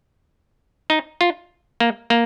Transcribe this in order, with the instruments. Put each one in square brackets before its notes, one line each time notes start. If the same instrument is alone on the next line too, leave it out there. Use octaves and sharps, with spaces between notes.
[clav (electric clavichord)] D#4
F4
A#3
A#3